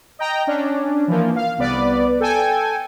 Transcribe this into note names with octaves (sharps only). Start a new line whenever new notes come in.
D#5 G5 A#5
C#4 D4
E3 F3 A#3
F5
C2 B3 B4 D5
A4 G5 G#5